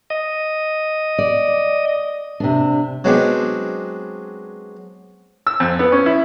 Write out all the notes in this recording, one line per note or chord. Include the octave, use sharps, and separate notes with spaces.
D#5
D5
C3 D4
F#3 G#3 B3 C4 D4
E6
F2
B3
C#4
E4